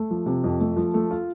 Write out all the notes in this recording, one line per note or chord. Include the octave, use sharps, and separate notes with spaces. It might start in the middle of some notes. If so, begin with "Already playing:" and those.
Already playing: A3
F3
C3
F2
A3
F3
A3
F4